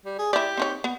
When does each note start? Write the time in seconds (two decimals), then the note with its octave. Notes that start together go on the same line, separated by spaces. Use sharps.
0.05 G3
0.18 G#4
0.33 E4 G4 D5
0.57 C4 D#4 C#5
0.84 B3